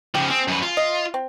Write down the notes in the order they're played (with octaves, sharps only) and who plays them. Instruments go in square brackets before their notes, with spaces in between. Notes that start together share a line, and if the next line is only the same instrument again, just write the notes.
[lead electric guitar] C#3 F3 [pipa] G4
[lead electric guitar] C4 [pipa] G#4
[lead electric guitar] F#2 B4
F4
[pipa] D#5
C4